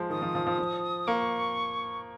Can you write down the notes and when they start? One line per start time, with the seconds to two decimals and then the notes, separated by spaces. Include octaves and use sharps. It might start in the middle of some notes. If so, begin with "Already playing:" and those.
Already playing: F3 G#3
0.10 D#3 D#6
0.22 F3
0.35 F3
0.47 F3
0.59 F3
1.08 A#3 C#6